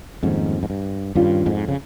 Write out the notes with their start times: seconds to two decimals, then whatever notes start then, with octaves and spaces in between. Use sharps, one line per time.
0.23 F2 G#2 D#3 G3 A#3 C#4
0.63 G#2
0.70 G2
1.15 G2 D#3 G3 C#4 F4
1.46 F2 G#2
1.68 C#3